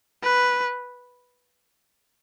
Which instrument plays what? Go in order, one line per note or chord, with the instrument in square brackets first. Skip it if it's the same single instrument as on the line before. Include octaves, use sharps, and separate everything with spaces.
[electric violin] B4